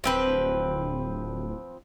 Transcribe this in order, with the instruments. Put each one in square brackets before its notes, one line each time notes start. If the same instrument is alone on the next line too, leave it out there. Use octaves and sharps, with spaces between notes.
[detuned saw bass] D1 [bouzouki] F3 C4 B4